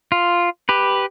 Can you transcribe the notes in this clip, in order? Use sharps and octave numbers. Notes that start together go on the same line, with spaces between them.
F4
G4 B4